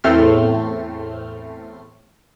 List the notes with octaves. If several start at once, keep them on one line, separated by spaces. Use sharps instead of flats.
E2 A2 A3 C4 C6 F6